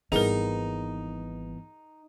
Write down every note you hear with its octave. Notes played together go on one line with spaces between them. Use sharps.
G#1 E3 G3 B3 D#4 G#4 A#4